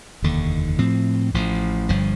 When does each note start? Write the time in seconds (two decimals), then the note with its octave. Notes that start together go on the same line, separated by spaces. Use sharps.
0.22 F1 D#2 D3
0.78 A2 F3 C4
1.34 A1 A2 F3
1.89 G1 G2 F3